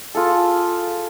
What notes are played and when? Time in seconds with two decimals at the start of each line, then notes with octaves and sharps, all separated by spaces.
0.15 F4 G#4 A4